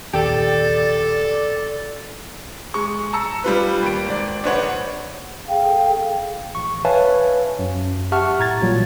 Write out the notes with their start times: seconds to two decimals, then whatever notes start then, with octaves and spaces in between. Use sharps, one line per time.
0.13 F1 A#1 D#2 G4 A4 D5
2.74 G#3 C#6
3.13 A5 A#5 E6 C#7
3.44 G3 F4 B4
3.83 D#2 D7
4.06 G#1 D5
4.43 A#1 D4 B4 C#5 F#5
5.48 G#4 A4 F5 G5
6.55 A1 C#6
6.85 B4 C#5 E5 F5 G#5 A5
7.59 F#2
8.12 G4 E5 F#5 A5 C#6 F6
8.39 A2 A#5 G#6 A6
8.61 A1 A#2 F#3 G3